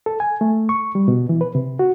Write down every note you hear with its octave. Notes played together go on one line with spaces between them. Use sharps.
A4
G#5
A3
C#6
G3
B2
E3
B4
C3
F#4